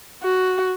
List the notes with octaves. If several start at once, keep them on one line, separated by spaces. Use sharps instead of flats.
F#4